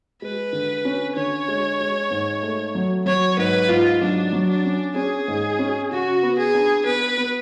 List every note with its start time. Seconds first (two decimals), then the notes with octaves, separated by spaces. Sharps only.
0.22 G#3 B4
0.53 D3
0.85 C#4
1.16 D3 C#5
1.48 G#3
1.80 G#3
2.11 G#2
2.43 A3
2.75 F#3
3.06 F#3 C#5
3.38 G#2 B4
3.69 G#2 F4
4.01 F#3 D4
4.33 F#3
4.49 D4
4.65 C#4
4.96 C#4 G#4
5.28 G#2
5.59 C#4
5.91 C#3 F#4
6.23 B3
6.38 G#4
6.54 D4
6.85 B3 B4
7.18 B3